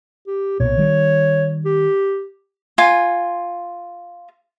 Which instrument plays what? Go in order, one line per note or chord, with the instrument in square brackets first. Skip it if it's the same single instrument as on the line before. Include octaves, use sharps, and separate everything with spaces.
[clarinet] G4
[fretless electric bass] B1 A#2 [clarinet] C#5
[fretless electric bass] D#3 G3
[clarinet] G4
[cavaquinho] F4 G#5